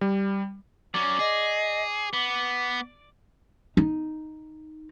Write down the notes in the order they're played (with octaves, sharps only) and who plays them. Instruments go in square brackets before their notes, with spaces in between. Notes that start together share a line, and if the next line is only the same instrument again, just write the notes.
[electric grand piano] G3
[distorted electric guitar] F#3 C#4 [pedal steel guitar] D5
[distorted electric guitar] G#4 [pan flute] D#5
[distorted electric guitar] B3 [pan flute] D6
[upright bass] D#4